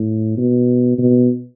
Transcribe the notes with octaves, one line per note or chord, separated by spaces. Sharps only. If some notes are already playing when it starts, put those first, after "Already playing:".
Already playing: A2
B2
B2